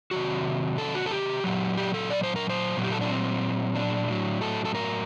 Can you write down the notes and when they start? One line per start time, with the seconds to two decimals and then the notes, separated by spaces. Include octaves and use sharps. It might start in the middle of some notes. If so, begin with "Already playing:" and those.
0.11 C3 D#3 F#3 F#4
0.78 A4
0.95 F#4
1.06 A4
1.11 G4
1.44 A#2 F#3
1.77 G4
1.94 A4
2.10 D5
2.23 C5
2.36 A#4
2.50 C5
2.77 A#2 F#3
2.84 G4
2.92 A4
3.01 D4
3.09 C4
3.76 D4
4.08 A2 F#3
4.41 A4
4.65 A4
4.75 A#4